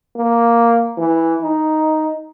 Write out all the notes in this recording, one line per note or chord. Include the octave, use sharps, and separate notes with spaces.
A#3
E3
D#4